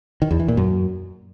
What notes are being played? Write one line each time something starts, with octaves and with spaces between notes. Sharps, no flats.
D#3
E2
E3
A#2
F#2